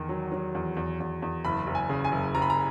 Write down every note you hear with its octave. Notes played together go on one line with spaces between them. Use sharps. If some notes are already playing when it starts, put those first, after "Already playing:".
Already playing: E2 D#3
F#3
F#3
E2
E2
E2
E2
F#1 B5
F#1
G#5
C#3
G#5
F#1
F#1 A#5
B5
A#5